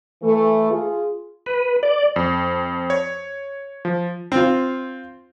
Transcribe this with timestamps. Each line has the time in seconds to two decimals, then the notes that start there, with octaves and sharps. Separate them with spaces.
0.22 E3 A3
0.71 F4 G#4
1.46 B4
1.83 D5
2.16 F2
2.90 C#5
3.85 F3
4.32 C4 F4